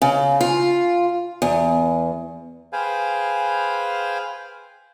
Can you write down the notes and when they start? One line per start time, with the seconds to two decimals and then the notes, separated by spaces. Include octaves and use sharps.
0.02 C#3
0.41 F4
1.42 E2
2.73 G#4 B4 C5 F5 G5 G#5